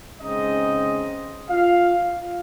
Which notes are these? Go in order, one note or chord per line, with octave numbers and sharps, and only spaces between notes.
C#3 G#3 C4 D#4 D#5
F4 F5